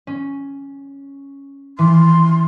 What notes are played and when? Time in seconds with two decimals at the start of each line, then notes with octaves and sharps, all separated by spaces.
0.07 C#4
1.79 E3 C6